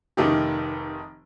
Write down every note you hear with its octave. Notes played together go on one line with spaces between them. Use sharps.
F1 D#3 A3 D#4 F4 G4